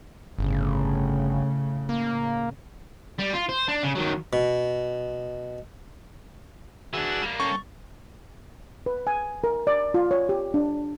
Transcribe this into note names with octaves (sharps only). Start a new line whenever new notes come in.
G1 A2 C#3
A#3
G3
F4
C5
D4
C#3
D#3 F#3
B2
E3 D4 F#4 G#4 E6
G3 A#3
C#4 A4 G5 C#6
B4
G#5
A#4
D5
F4
C#5
G4
D4